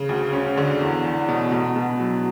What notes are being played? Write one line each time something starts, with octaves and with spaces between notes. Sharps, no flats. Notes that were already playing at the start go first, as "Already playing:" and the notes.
Already playing: C#3
D2
C#4
D3
E2
E2
B2
B2
B2
F#3